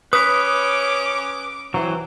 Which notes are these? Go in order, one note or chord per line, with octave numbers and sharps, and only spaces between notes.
C#4 B4 B5 D6 D#6
E3 F#3 C4